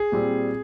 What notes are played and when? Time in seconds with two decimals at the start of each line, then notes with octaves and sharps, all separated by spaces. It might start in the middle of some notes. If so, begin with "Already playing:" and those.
Already playing: G#4
0.12 A#2 G3 C4